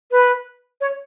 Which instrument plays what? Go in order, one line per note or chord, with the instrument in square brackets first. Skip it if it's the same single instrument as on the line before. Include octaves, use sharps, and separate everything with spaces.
[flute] B4
C#5